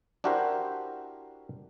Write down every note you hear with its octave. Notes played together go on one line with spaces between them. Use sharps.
D4 E4 F#4 G4 A#4 C5